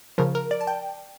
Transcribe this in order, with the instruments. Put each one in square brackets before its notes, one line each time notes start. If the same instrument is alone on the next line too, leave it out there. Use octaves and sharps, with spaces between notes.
[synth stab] C#3 F3 A#4
A#4
D5
A5
G5